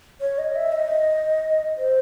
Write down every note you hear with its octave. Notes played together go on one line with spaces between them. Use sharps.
C#5
D#5
E5
D#5
C5